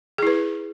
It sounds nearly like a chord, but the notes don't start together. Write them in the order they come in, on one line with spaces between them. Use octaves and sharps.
G#4 E4 B4